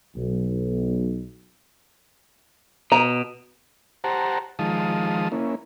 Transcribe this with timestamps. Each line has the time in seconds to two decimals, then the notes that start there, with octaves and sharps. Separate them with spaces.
0.16 B1
2.92 B2 A#5
4.04 G4 C5 F#5 A5 A#5
4.59 D#3 F3 G#3 F5 A5 D#6
5.32 A#3 C#4 E4